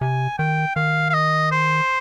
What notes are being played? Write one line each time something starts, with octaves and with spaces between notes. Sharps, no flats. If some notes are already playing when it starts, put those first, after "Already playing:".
C3 G#5
D#3 G5
D#3 F5
F5
D#5
C5